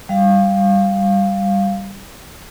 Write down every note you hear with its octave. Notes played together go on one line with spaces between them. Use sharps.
G3 F5